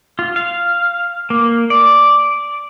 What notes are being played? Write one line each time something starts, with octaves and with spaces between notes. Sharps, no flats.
F4
F5
A#3
D5